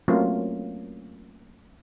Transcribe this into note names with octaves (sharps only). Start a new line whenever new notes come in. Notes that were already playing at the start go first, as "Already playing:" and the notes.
F#3 A3 A#3 C4 C#4 F4